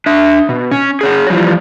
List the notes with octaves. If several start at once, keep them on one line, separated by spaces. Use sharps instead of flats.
D4 E5
B2
C#4
G#4 C#5 F#5
E3 F3 G3